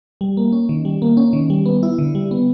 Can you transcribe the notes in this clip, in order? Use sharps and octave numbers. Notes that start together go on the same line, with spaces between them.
G3
A#3
C#4
D#3
G3
A#3
C#4
D#3
G3
B3
E4
D3
G3
B3